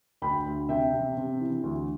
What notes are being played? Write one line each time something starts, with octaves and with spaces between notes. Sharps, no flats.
D2 G5 B5
D2
C3 E5 G5
C3
C3
E3
D2